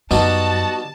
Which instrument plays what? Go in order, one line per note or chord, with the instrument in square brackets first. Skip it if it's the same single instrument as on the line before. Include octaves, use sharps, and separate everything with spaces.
[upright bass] F#2 [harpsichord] G3 B3 D#4 [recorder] F#4 [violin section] A5